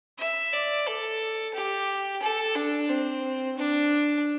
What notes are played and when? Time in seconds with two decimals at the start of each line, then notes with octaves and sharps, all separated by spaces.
0.19 E5
0.53 D5
0.86 A4
1.54 G4
2.22 A4
2.56 D4
2.89 C4
3.57 D4